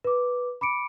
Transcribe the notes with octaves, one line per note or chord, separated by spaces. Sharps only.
B4 D6
B5 D6 C#7 D7